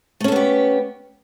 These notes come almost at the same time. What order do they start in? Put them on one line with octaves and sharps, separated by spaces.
A3 C#4 A4 B3 G4